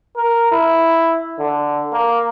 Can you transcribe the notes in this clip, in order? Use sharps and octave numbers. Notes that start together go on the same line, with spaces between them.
A#4
E4
D3
A#3